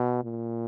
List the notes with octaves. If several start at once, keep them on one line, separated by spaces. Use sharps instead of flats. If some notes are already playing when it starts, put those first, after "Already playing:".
Already playing: B2
A#2